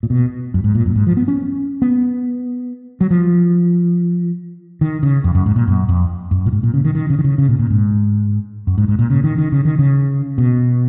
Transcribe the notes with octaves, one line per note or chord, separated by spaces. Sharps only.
A#2
B2
F#2
G#2
A#2
F#2
G#2
F3
B3
C#4
B3
F#3
F3
D#3
C#3
F2
F#2
G#2
A#2
F#2
F2
F#2
A#2
G#2
A#2
C#3
D#3
D#3
C#3
D#3
C#3
C#3
A#2
A#2
G#2
F#2
G#2
G#2
A#2
C#3
D#3
D#3
C#3
D#3
C#3
B2